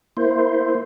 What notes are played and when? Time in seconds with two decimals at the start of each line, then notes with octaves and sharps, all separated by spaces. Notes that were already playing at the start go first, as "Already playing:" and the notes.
0.17 A#3 E4 C5